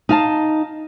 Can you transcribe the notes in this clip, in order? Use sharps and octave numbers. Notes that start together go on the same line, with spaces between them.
D#4 F5 A5